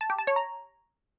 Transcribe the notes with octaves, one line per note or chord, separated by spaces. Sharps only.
A5
G4
A5
C#5
A#5